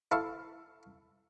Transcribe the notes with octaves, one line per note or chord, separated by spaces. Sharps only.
E4 A4 F5 C#6